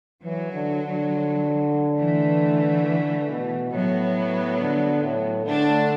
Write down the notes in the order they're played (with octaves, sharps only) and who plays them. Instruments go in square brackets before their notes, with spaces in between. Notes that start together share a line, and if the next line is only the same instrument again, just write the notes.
[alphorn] E3 [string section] F#3
[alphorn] D3
D3
[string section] E3 A3
[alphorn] D3
B2
[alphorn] A2 [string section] F#3 B3
[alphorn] D3
A2
[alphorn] D3 [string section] A3 D4